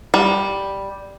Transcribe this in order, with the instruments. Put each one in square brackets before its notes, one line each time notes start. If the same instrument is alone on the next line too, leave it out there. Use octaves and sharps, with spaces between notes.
[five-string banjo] G3